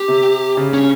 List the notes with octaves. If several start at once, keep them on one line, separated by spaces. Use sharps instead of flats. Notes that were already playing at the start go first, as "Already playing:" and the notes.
Already playing: G4
C3
C#3
C#4